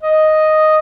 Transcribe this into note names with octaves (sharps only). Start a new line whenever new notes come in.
D#5